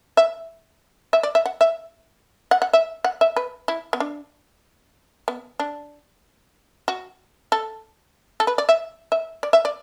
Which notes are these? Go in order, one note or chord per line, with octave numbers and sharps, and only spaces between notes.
E5
E5
D5
E5
F#5
E5
F#5
F#5
E5
F#5
E5
B4
E4
B3
D4
B3
D4
F#4
A4
A4
B4
D5
E5
E5
D5
E5
D5